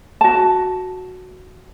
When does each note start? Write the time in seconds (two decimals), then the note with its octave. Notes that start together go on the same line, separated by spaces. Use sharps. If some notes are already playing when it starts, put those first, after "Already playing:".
0.21 F#4 A5